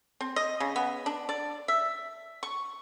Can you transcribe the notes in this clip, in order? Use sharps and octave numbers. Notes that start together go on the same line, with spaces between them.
C4
D#5
C#3
B3
D4
D5
E5
C#6